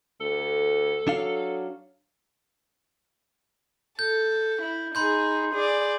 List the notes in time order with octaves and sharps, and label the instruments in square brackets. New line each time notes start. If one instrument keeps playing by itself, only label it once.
[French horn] D2 [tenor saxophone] A4
[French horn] F#3 [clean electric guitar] D4 F5
[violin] A4 [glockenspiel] G6
[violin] E4
[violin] D#4 G#4 [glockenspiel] B5 C6 G6
[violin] G#4 D5